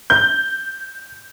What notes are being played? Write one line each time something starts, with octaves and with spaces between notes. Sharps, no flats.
G6